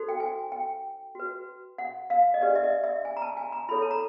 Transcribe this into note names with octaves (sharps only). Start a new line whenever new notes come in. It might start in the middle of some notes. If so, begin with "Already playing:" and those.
Already playing: D#4 F#4 A4 C5
G5
G#5
G5
F#4 B4
F#5
F5
D#5
D4 G4 B4 D5
E5
D#5
E5
G#5
A#5
A5
G#5
A#5
E4 A4 C#5 B5
A5
A#5